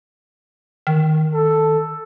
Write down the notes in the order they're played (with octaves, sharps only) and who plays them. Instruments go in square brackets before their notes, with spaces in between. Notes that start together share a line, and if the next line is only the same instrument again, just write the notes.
[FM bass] D#3
[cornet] A4